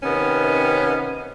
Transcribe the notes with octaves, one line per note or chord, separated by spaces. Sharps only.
C3 D#3 B3 C#4